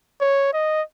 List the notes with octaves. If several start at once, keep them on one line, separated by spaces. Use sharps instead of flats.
C#5
D#5